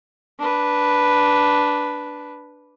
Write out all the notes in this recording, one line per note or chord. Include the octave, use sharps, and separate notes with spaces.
D4 B4